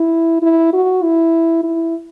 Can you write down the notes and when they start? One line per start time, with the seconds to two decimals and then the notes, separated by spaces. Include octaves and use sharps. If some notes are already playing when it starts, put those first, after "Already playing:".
Already playing: E4
0.42 E4
0.73 F#4
1.03 E4
1.63 E4